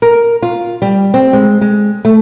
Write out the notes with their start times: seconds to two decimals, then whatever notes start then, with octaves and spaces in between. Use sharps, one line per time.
0.02 A#4
0.42 F4
0.82 G3
1.14 C4
1.33 G#3
1.61 G#3
2.05 A3